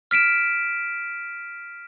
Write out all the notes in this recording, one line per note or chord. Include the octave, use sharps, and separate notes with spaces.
F6 B6 D7 E7